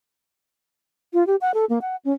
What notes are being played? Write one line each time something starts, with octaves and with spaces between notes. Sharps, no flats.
F4
G4
F#5
A4
A#3
F#5
C#4